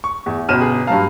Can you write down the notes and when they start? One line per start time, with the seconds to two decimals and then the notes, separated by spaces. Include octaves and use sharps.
0.04 C#6
0.26 E2
0.49 G1 B2 C#4 F6 D#7 E7
0.61 G#4
0.87 G2 F#3 F5 A5 A#5